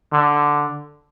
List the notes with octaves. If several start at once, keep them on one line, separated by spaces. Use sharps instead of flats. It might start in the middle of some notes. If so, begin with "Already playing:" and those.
D3